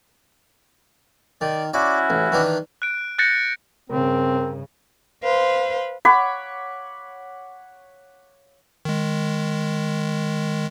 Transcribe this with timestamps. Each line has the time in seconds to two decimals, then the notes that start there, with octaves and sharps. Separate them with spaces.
1.41 D#3 D5
1.74 C#4 E4 F#4 D5
2.10 A1
2.32 D#3 E3 D4
2.82 F#6 D7
3.18 F#6 G6 A6 A#6 C#7
3.90 G2 C#3 C4 A#4
5.23 B4 C5 F5
6.05 C#5 F#5 B5 D6
8.85 D#3 G#3